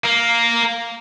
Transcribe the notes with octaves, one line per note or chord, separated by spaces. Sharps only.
A#3